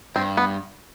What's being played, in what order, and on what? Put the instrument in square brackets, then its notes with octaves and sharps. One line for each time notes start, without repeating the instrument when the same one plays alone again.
[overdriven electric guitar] G2 [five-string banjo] C4
[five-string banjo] B3